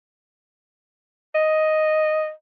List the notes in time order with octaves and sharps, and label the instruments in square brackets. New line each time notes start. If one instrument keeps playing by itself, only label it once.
[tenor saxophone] D#5